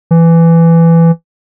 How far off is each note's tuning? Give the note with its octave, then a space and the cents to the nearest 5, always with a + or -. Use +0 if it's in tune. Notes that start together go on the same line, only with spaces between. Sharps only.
E3 +15